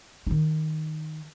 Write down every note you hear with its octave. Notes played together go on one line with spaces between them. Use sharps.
D#3 D#4